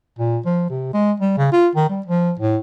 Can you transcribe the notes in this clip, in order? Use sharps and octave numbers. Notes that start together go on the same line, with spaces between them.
A#2
F3
C3
G#3
G3
C#3
F4
D#3
G3
F3
A2